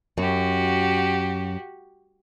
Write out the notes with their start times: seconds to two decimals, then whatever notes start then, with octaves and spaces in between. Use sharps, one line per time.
0.18 F#2 F#4 G4